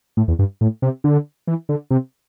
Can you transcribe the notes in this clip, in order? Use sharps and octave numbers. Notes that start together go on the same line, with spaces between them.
A2
E2
G2
A2
C3
D3
E3
D3
C3